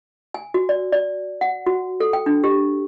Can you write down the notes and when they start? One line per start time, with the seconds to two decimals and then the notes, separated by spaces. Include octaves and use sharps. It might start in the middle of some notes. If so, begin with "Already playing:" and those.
0.34 G#5
0.54 F#4
0.69 D5
0.92 D5
1.41 F#5
1.66 F#4
2.00 A4
2.13 G5
2.26 D4
2.44 G4